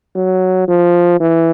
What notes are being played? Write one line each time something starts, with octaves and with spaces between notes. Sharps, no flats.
F#3
F3
E3